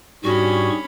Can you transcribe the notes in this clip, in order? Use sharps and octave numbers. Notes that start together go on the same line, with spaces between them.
G#2 G3 C#4 D4 F#4 G#4 B5 C#6